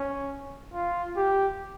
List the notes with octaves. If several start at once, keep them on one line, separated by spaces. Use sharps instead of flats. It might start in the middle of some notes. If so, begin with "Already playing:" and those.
Already playing: C#4
F4
G4